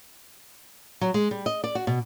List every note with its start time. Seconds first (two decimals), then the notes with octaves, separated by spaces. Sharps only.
1.01 F#3
1.14 G#3
1.31 G3
1.46 D#5
1.64 D5
1.75 F#4
1.87 B2